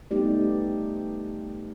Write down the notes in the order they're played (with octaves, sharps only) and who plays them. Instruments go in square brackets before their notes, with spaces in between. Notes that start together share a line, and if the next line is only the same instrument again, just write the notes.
[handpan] G3 A3 B3 D#4 G4 D5